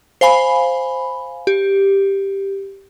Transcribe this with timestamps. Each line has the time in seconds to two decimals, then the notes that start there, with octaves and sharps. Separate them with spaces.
0.21 C5 F5 G#5 B5
1.47 G4